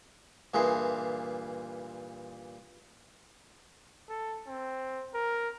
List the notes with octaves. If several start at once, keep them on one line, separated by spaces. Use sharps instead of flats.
G2 A#2 E3 G#4 C6
A4
C4
A#4